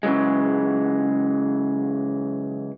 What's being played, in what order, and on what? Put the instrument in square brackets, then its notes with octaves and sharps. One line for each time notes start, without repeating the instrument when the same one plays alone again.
[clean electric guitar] C#3 E3 F#3 G#3